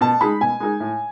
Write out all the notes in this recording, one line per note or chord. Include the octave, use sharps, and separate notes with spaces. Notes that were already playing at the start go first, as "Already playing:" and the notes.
B2 A5
G#3 D#4 G#4 B5
B2 G#5
G#3 D#4 G#4
A2